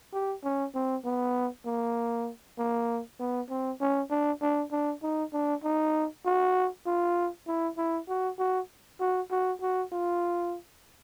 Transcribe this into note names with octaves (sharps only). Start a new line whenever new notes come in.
G4
C#4
C4
B3
A#3
A#3
B3
C4
C#4
D4
D4
D4
D#4
D4
D#4
F#4
F4
E4
E4
F#4
F#4
F#4
F#4
F#4
F4